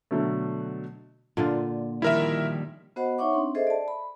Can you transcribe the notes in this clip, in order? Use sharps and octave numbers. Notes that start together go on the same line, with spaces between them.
B2 D3 F#3 A3
A#2 D3 F4
D#3 F3 G3 E4 A#4 E5
B3 F#4 C5 D#5 F#5 B5
D#4 C#5 E5 F#5 C#6 D6
C4 D4 C6
G#4 A4 C5 D#5 E5
D5 A5
B5